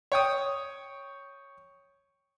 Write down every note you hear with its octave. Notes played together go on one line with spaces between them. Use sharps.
C#5 G5 D#6